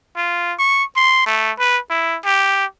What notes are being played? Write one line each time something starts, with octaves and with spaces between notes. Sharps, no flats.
F4
C#6
C6
A3
B4
E4
G4